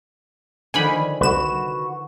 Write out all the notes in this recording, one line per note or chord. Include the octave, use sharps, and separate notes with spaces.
D3 D#3 F3 G#5 B5
C2 F#4 B4 E7